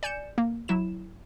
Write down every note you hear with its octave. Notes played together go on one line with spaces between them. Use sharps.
D5 G#5 G6 C#7 E7
A#3
F#3 E4 E7